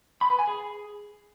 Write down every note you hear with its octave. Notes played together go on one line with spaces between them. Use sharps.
B5
B4
G#5
G#4